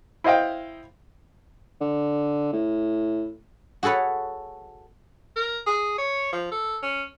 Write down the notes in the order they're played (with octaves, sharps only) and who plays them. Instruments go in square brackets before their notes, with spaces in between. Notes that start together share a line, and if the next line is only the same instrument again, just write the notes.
[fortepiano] E4 C5 D#5 F5 G5
[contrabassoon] D3
A2
[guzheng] F#4 G#4 A4 B4 C#5
[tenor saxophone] A#4
G#4
C#5
F3
A4
C#4